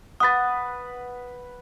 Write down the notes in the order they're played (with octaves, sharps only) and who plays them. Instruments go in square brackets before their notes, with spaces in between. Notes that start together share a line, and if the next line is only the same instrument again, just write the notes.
[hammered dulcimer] B4 F#5 [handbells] D#6 A6